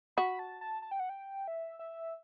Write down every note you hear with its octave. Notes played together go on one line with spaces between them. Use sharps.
F#4 B5
A5
A5
A5
G5
F#5
G5
E5
E5